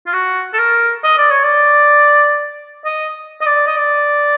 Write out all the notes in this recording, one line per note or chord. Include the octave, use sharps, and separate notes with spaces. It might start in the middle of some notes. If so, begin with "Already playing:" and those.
F4
F#4
A4
A#4
D#5
D5
C#5
D5
D#5
D#5
D5
D#5
D5